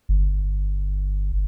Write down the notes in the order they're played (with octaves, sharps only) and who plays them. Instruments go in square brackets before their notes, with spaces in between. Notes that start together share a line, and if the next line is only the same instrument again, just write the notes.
[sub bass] G1